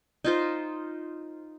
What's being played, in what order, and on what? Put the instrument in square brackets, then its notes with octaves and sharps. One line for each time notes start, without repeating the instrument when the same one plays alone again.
[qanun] D#4 F4 C5